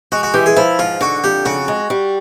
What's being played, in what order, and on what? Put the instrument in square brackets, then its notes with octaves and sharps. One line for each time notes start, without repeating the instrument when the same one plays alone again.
[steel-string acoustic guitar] G#3 [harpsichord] F#4
[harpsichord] F#4
[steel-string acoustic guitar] E3 [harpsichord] G4
[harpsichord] G#4
[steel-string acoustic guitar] F3 [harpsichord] E4
[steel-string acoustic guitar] G#2 [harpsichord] F4
[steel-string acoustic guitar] D3 [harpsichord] F#4
[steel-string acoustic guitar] F2 [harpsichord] G4
[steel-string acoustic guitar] C#3 [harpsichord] F#4
[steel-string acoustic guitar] G#3
G3